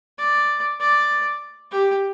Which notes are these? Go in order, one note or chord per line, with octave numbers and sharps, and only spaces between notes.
D5
D5
G4